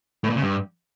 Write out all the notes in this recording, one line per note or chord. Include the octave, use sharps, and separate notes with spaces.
A2
A#2
C#3
G2